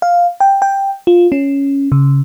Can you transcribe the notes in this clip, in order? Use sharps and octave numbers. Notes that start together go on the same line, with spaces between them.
F5
G5
G5
F4
C#4
C#3